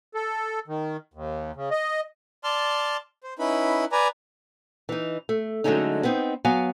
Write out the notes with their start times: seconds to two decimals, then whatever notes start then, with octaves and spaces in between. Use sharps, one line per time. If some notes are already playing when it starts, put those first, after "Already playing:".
0.15 A4
0.68 D#3
1.14 D#2
1.55 C#3
1.71 D#5
2.44 D5 A5 C6 F6
3.23 C5
3.39 C#4 D#4 E4 B4 B5
3.92 B4 D5 G#5 A#5
4.89 E3 D#4
5.29 A3
5.64 D3 F#3 G#3 A3 C#4 D#4
6.04 B3 C4 D#4
6.45 F#3 B3 F5 G#5